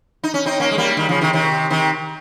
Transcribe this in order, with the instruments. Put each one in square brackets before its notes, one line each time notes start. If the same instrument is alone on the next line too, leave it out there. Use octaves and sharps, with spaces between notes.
[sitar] D#4
C#4
C4 D#4
A#3 C#4
G#3
G3 A#3
D#3 G3
C#3 F3
C3 D#3
C3 D#3
C3 D#3